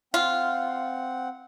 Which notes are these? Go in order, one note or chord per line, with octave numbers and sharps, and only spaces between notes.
C4 F4 F#5